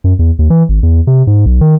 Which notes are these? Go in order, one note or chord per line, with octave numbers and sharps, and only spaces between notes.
F#2
E2
D#2
E3
G#1
E2
C3
G#2
B1
D#3